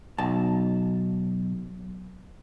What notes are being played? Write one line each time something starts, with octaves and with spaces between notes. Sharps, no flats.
B1 A5